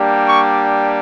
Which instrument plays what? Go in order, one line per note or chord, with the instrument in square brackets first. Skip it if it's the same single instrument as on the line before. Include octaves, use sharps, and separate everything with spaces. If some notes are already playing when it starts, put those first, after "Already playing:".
Already playing: [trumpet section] G3 A#3 D4 G4
C#6